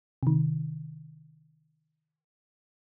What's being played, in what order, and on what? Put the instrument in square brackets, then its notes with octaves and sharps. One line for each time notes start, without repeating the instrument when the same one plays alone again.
[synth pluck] C3 D#3